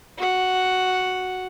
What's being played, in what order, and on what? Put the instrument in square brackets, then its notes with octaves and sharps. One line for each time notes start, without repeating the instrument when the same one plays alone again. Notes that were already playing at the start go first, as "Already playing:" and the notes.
[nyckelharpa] F#4 F#5